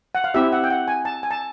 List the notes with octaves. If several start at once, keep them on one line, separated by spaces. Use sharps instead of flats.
F#5
F5
C4 E4 G4 E5
F#5
G5
F#5
G#5
A5
G#5
A5